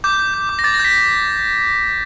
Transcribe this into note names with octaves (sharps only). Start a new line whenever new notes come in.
D6 G6
G6
G6
D6
A#6
D6 A6
A#6
G6
B6